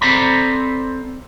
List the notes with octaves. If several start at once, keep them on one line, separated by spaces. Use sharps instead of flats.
C4 A4 C5 D5 A#5 B5